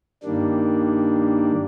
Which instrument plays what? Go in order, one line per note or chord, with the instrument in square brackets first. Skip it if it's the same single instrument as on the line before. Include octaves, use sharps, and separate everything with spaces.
[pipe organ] G2 D#3 G3 A#3 D4